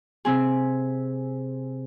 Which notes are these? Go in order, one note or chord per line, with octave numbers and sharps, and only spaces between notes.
C3 C4 G#4